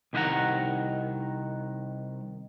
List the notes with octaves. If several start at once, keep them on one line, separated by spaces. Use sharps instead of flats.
C2 D#3 G4 B4 F#5 A#5